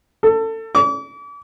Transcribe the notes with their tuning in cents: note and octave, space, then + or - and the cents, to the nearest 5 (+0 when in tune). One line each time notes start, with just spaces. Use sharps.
A4 +25
D6 -40